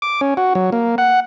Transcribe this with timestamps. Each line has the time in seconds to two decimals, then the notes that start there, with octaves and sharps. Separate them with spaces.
0.02 D6
0.21 C#4
0.37 F#4
0.55 F#3
0.72 A#3
0.98 F#5